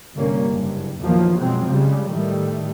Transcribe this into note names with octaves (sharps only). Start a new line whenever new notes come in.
G1 C2 G3 A#3 C#4
F#1 G2
A#1 E2 D#3 F3 F#3 A#3
F#2 B2 F3 F#3 G#3 C4
C#3 G3 G#3
A2 D#3 G3 A3